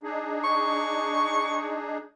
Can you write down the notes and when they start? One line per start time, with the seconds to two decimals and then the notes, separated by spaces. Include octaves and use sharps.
0.03 D4 D#4 G#4
0.44 C#6